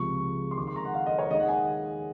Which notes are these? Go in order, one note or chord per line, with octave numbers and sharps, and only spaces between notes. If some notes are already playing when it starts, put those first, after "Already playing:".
Already playing: C#2 C3 F3 G#3 C#6
C6
D#2 D#3 G#3 C#6
C6
A#5
F#5
F5
D#5
C#5
D#2 D#3 G#3 D#5
F#5
G#5